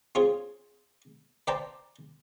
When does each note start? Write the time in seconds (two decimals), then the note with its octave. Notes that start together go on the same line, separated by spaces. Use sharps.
0.15 C4 C#4 F4 G#4
1.47 B4 C5 D5 G5 A5 A#5